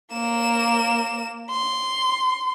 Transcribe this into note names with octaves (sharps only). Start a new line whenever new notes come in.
A#3 E7
C6